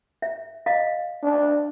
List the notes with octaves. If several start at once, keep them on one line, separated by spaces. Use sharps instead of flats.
E5
D#5 F5
D4